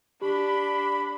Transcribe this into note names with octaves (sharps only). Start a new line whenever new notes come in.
D4 G4 B5